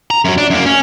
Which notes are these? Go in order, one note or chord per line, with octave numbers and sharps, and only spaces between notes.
A#5
F#2 F#3
D4
F#2 A#3
C#4